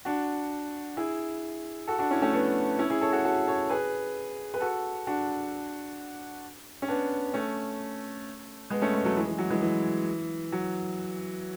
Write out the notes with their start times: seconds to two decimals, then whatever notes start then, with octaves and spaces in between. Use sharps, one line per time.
0.05 D4 F#4
0.97 E4 G#4
1.88 F#4 A4
1.99 D4 F#4
2.11 C#4 E4
2.22 A3 C#4
2.33 B3 D4
2.79 C#4 E4
2.90 E4 G#4
3.01 A4 C#5
3.13 F#4 A4
3.25 F#4 A4
3.47 A4 C#5
3.69 G#4 B4
4.54 B4
4.60 F#4 A4
5.07 D4 F#4
6.82 C#4
6.88 B3 D4
7.34 A3 C#4
8.70 G#3 B3
8.82 A3 C#4
8.93 G#3 B3
9.05 F#3 A3
9.17 E3 G#3
9.27 E3
9.38 F#3
9.50 E3 G#3
9.62 E3
10.52 F#3